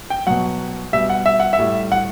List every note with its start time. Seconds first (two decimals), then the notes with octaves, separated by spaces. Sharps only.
0.10 G5
0.27 B2 F#3 F#5
0.93 B2 G3 E5
1.10 F#5
1.26 E5
1.40 F#5
1.53 E5
1.59 A2 G3
1.92 F#5